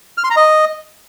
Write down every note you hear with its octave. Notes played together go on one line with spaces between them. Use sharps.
F6
C6
A#5
D#5